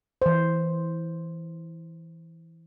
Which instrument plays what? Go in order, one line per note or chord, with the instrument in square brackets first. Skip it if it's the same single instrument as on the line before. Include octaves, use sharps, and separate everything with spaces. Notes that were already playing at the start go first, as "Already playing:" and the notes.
[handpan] E3 C5